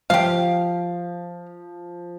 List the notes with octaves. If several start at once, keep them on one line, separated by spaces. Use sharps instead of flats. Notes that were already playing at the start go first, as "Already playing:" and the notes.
F3 G4 F5